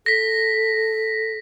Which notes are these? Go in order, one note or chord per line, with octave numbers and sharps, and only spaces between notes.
A4 A#6 B6